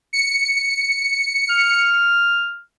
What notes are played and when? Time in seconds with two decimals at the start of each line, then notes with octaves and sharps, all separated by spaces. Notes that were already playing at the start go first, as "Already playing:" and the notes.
0.13 C#7
1.50 F6